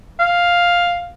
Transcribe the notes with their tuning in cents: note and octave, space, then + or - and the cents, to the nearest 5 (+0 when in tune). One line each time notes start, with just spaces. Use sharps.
F5 +5